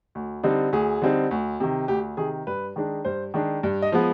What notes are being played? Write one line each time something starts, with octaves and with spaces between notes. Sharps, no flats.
D2
D3 G3 C4 D#4
D2 G#4
D3 G3 C4 D#4
D2
C3 D#3
D2 G4
C3 D#3 G#4
G2 B4
D#3 G#3 D4
G2 C5
D#3 G#3 D4
G2
D#5
F3 G#3 B3